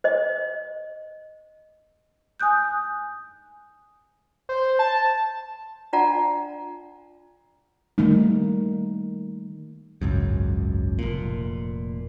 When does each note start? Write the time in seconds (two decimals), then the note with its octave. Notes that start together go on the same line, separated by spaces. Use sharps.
0.04 C5 D#5
2.40 G#5 D#6 F#6 G6
4.49 C5
4.79 A5
5.93 D4 F4 D5 F#5 A5 A#5
7.98 D#3 G3 A3 A#3 D#4
10.02 G#1 C#2 F#2
10.99 F1 A#2